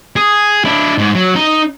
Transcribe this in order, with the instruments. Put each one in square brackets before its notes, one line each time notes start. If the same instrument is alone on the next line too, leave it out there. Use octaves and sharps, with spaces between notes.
[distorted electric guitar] G#4
D4 E4
G#2
F#3
D#4